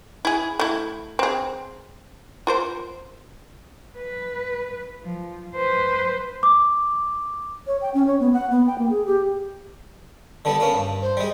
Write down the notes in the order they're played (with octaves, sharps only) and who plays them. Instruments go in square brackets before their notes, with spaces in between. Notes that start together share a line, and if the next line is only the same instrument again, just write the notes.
[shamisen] E4 G#4
A3 E4
C4 G#4
F4 A#4 C5
[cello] B4
F3
B4 C5
[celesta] D6
[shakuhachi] C#5
G5
C#4
C#5
B3
F#5
B3
G5
A#3
G#4
G4
[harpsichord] D3 G3 B3 [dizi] A5
[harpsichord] A#3 B3 C#4
G2
[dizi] C5
[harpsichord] G3 G#3